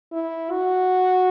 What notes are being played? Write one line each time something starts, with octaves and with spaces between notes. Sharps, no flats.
E4
F#4